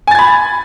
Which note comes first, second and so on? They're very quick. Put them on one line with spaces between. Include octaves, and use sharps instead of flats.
G#5 A6 G#6 B5